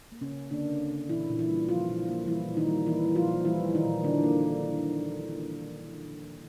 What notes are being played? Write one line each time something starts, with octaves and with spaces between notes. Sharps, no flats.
A#3
C#3 C#4
C#3
D3 A#3 D4
C#3
C#3
A#2 E3 E4
A#2
E3 E4
G3
F3 A#3 F4
A#2
A#3
E3 G3 E4
A#2
D#3 D#4
G3
E3 A#3 E4
G3
F3 F4
A#2
E3 G3 E4
G3
D#3 D#4
A#2
D3 A#3 D4
A#3